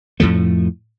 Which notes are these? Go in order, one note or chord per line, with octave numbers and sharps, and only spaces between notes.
F2 A2 F3 A3